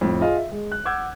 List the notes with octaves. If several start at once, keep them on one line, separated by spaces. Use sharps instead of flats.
F2 A2
F4 G#4 D#5 F5
E5
G#3
F#6
F#5 D6 E6 G6 G#6